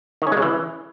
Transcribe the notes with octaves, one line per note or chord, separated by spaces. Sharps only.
D#3
C#4
G#3
C#3
E3